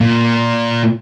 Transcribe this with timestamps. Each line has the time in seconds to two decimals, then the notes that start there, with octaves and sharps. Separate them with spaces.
0.01 A#2